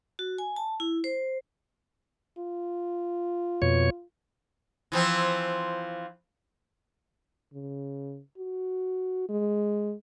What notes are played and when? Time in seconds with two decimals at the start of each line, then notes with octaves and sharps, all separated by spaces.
0.19 F#4
0.38 G#5
0.56 A5
0.80 E4
1.04 C5
2.38 F4
3.62 F2 B2 C#5
4.92 E3 F3 C4
7.54 C#3
8.38 F#4
9.29 G#3